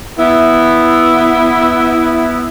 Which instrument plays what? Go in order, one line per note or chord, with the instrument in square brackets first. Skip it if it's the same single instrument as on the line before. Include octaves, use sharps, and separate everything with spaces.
[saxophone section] B3 E4